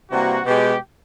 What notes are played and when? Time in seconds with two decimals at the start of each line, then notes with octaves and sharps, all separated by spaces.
0.10 C3 E3 G3 A#3 F#4
0.45 B2 G#3 G4